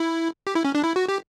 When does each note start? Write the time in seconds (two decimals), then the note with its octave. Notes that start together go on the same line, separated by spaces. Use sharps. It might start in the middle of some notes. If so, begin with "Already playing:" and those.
Already playing: E4
0.47 G4
0.55 E4
0.65 C#4
0.75 D4
0.84 E4
0.96 F#4
1.08 G4